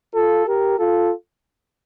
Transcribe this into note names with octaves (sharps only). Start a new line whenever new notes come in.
F4 A4
G4 A#4
F4 A4